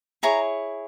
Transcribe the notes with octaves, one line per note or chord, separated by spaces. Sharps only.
E4 G#4 C#5 A#5